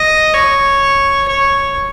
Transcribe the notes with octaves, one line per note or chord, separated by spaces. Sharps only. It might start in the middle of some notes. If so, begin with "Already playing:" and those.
Already playing: D#5
C#5
C#5